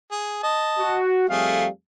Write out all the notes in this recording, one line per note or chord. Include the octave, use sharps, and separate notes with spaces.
G#4
D#5 A5
F#4
F2 G3 A3 G#4 F5